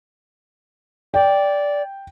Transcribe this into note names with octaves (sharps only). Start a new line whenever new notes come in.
D5 G5